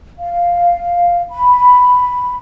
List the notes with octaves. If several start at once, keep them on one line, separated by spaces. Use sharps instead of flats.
F5
B5